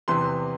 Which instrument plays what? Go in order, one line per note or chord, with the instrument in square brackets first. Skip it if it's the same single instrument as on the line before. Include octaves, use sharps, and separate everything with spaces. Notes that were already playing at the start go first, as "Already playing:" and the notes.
[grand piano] E2 C3 E3 C6